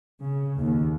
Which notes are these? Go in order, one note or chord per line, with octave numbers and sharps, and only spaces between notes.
C#3
D#2